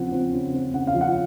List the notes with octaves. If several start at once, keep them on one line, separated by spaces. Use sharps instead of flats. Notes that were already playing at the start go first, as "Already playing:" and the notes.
Already playing: C#3 F3 C4 F#5
C4
C#3
C4
C#3 F#5
F5
F3
F#5